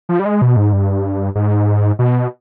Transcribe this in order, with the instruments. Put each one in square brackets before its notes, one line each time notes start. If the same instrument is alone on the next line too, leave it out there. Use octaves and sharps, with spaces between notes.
[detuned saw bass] F3
G3
G#3
B2
G#2
G2
G#2
B2